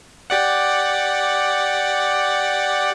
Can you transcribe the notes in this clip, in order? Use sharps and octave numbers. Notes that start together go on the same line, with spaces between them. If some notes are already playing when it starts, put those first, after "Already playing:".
G4 D5 F#5